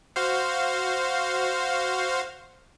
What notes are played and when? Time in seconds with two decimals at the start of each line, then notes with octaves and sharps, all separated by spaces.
0.16 F#4 C5 F5